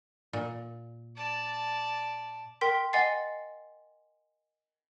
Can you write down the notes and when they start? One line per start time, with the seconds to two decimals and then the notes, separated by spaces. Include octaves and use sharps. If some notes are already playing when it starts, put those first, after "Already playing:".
0.33 A#2
1.16 D5 A5
2.61 A#4 G5 C6 B6
2.93 D#5 F#5 G#5 C6 A6 C7